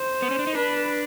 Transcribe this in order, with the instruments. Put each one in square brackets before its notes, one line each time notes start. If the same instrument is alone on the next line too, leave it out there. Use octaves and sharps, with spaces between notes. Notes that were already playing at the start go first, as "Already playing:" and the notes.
Already playing: [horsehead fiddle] C5
[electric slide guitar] B3
C#4
D4
D#4
[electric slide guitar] D4 [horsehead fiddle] B4